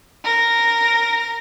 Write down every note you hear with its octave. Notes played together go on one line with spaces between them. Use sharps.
A#4 A#6